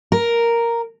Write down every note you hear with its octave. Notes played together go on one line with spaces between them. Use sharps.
A#4